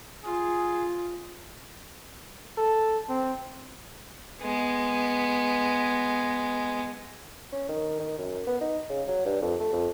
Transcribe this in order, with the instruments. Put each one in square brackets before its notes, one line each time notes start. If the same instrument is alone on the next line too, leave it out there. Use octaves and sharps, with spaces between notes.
[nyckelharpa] F4 [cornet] G#4
[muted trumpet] A4
C4
[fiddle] G#3 B3
[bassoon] C#4
D#3
D#3
F#2
B3
D#4
C#3
F#3
G2
F2
A3
F2